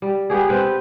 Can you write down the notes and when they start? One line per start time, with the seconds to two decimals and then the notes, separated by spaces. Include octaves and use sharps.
0.02 G3
0.30 B3 G4 G#4
0.49 C4 B4 G5